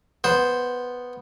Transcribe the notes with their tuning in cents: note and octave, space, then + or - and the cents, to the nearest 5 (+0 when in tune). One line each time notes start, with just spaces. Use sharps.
B3 +0 C5 +0